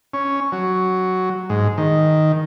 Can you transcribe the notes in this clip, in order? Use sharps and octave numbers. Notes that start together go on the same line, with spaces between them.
C#4
F#3
G#2
D#3